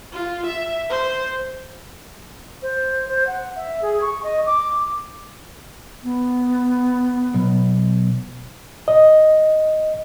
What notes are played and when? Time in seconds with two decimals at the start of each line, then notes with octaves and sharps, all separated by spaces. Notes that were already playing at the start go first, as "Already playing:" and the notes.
0.12 F4
0.46 E5
0.90 C5
2.62 C5
3.08 C5
3.27 F#5
3.56 E5
3.82 G#4
4.02 C#6
4.23 D#5
4.47 D6
6.03 B3
7.35 B1
8.88 D#5